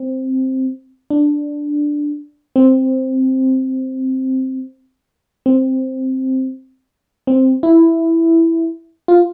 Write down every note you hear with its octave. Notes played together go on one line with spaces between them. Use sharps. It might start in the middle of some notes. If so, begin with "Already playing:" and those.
Already playing: C4
D4
C4
C4
C4
E4
F4